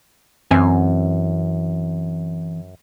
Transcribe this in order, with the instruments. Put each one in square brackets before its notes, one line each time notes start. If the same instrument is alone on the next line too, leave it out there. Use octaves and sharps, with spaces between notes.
[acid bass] F#2 [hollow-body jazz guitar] E3 C4 G#5